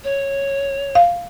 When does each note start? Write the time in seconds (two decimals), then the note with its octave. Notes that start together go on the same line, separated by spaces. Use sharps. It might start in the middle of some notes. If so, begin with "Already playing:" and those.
0.04 C#5
0.95 F5